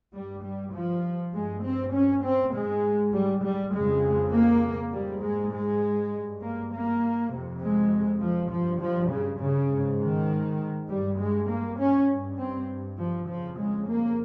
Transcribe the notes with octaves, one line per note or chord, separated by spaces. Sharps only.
G2 G3
G3
F3
G2 G#3
C4
C#4
C4
G#2 G#3
G3
G3
F2 C#3 G#3
A#3
G#2 G3
G#3
G#3
G2
A#3
A#3
F2 C3
G#3
F3
G2 F3
F3
C#3
C#3
G#2
D#3
G2 G3
G#3
A#3
C#4
G2
C4
F3
F2 C#3 F3
G#3
A#3